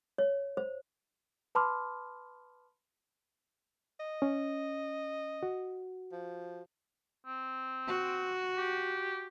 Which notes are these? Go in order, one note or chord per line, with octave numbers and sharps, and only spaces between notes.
C#5
C5
B4 A5 B5 C6 D6 F6
D#5
C#4
F#4
F3
C4
F#4
G4